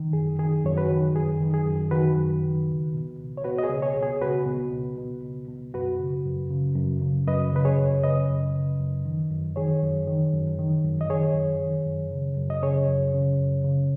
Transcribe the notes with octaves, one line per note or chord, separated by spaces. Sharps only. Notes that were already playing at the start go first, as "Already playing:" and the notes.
Already playing: D#3
F#2 G#4
D#3 G#4
F#2 C#5
F#4 B4
D#3
F#2 G#4
D#3
G#4
F#2
D#3 F#4 B4
F#2
D#3
C#2
B2
C#2
C#5
B2 F#4 B4
D#5
G#4 C#5
C#2
G#4 C#5
B2
G#4
C#2 F#4 B4
B2
C#2
B2
C#2
B2
F#2 F#4 B4
C#3
F#2
C#3
F#2
C#3
F#2 B4 D#5
C#3 B4
G#4 C#5
F#2
C#3 B4 D#5
F#2
C#3
F#2
D#3
F#2
D#3 G#4 C#5
F#2
D#3
F#2
D#3
F#2
D#5
D#3 G#4 C#5
F#2
D#3
F#2
C#3
F#2
D#5
C#3 G#4 C#5
F#2
C#3
F#2
C#3